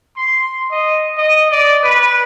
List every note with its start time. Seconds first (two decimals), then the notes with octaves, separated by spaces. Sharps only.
0.16 C6
0.71 D#5
1.17 D#5
1.51 D5
1.83 B4